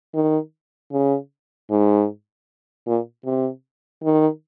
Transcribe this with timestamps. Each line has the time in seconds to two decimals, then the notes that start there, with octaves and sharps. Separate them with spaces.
0.14 D#3
0.92 C#3
1.70 G#2
2.87 A#2
3.25 C3
4.04 D#3